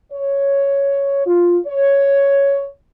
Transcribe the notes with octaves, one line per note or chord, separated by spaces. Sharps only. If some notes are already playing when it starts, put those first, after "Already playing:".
C#5
F4
C#5